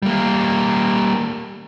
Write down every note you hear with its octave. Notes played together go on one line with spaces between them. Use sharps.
G3 A#3